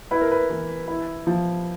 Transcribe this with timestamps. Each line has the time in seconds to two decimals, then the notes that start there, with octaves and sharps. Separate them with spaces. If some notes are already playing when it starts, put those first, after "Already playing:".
0.11 E4 B4
0.21 A#4
0.31 B4
0.50 E3
0.88 E4
1.27 F3